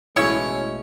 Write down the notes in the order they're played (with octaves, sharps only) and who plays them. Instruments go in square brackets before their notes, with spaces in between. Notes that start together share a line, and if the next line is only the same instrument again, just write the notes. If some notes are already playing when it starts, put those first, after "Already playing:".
[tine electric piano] A1 B2 A3 [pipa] E3 E4 C#6 [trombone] G#3 [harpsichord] C#4